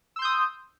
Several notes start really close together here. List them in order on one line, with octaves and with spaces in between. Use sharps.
E6 C6 G6 D#6